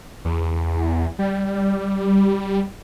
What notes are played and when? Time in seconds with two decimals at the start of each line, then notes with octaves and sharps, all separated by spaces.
0.25 E2
1.19 G3